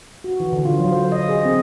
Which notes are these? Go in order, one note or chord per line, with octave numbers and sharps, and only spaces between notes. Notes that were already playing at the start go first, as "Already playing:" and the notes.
F#4
E3
D3
F4
F#3
C5
D#5
G#4
C4